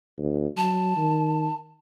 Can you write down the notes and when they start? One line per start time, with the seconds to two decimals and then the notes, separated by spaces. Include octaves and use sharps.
0.18 D2
0.57 F#3 A5
0.97 D#3